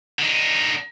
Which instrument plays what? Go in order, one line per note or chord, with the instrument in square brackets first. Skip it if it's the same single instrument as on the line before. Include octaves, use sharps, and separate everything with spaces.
[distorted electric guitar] D3 D#4